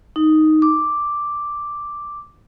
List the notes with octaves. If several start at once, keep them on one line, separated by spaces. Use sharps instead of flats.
D#4
D6